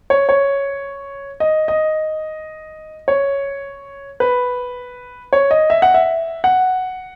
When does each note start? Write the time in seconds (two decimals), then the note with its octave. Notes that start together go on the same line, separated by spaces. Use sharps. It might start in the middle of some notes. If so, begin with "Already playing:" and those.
0.10 C#5
0.29 C#5
1.40 D#5
1.68 D#5
3.08 C#5
4.20 B4
5.33 C#5
5.51 D#5
5.70 E5
5.82 F#5
5.94 E5
6.44 F#5